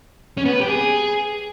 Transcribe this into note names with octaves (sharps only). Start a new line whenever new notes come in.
C#4
B3
B4
G4
G#4